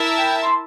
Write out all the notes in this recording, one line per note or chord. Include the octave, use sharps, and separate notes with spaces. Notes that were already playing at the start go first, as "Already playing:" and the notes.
Already playing: E4 A#4 E5 A5
G5
C6